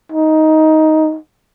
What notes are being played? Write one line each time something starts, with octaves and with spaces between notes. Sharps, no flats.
D#4